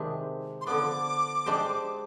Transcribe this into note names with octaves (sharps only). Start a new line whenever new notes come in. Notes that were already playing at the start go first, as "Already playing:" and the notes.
Already playing: C3 D#3 G#3 D4 G4
C6
D3 F3 B3 D6
G#3 D4 G4 C5